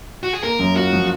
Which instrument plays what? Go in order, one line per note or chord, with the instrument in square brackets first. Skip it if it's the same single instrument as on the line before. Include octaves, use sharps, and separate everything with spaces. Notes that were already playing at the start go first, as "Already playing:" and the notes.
[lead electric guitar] F#4
G#4
[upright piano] A#3 [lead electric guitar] A#4
[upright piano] F#2
[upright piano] F4 [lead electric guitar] F#4
[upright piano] F3